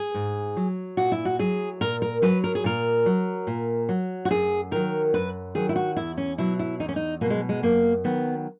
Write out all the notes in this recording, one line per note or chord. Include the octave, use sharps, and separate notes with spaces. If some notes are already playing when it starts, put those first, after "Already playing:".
Already playing: G#4
G#2
F#3
A#2 F#4
E4
F#4
F#3 G#4
A#2 A#4
A#4
F#3 B4
A#4
G#4
A#2 A#4
F#3
A#2
F#3
F#4
F#2 G#4
D#3 F#3 A#4
F#2 B4
D#3 F#3 G#4
E4
F#4
E2 E4
C#4
B2 F#3 E4
E4
E2 D#4
C#4
D#4
B2 F#3 A#3
G#3
G#3
F#2 A#3
D#3 F#3 B3